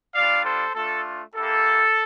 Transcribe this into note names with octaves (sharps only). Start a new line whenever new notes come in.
G3 D4 F4 D5 F5
A4 C5
A3 D4 F4 A4
A#3 E4 G4 A4